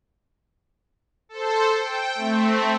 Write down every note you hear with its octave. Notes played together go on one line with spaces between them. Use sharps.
A4 C5
G5
A3 C4